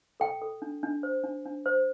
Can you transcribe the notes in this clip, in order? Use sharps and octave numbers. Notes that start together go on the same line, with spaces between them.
A4 G5
A4
D4
D4
C5
D4
D4
C5